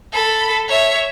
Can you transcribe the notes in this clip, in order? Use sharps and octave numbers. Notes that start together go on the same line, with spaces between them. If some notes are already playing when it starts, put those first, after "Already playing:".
A4 B5
C#5 E5